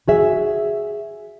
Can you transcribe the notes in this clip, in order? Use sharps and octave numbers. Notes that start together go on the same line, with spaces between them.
F#4 G#4 E5